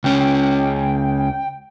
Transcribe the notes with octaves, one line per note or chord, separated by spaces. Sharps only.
C#2 C#4 G5